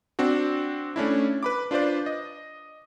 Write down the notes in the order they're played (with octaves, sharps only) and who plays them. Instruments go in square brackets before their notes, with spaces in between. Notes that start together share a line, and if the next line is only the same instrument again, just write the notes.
[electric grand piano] C4 D4 F#4
A3 C#4 D4 E4
B4 B5 D6
D4 F4 B4 C5 D5
D#5